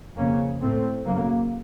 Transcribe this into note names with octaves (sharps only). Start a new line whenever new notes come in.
F2 C#3 A#3 C#4
A2 A3 C4
F#2 C#3 F#3 A#3